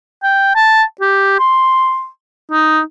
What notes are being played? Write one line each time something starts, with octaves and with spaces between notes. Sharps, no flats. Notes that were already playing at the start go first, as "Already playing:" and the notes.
G5
A5
G4
C6
D#4